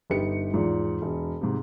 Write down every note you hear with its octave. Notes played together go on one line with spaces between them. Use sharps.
G1 D#4 G4 B4 C#7
E2 G#2 F3
E1
G#2 C3